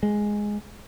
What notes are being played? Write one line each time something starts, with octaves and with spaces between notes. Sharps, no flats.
G#3